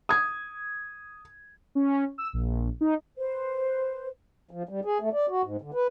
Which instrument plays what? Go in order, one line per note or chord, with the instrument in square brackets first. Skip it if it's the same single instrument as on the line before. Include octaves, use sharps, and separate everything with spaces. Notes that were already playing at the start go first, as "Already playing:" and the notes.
[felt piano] D#6 G#6
[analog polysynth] C#4
E6
A#1
D#4
[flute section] B4 C5
[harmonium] F3
G3
G#4
A3
D5
F#4
G#2
D3
B4